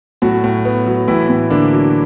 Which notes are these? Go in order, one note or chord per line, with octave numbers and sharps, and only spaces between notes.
A2 F#3 F#4
A2
B3
F#3
A2 E3 E4
A2
D3 A#3 D4
F#3